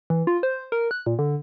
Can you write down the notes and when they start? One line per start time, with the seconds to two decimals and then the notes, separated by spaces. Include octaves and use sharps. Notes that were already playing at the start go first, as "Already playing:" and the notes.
0.10 E3
0.27 F4
0.43 C5
0.72 A#4
0.91 F#6
1.06 A#2
1.19 D3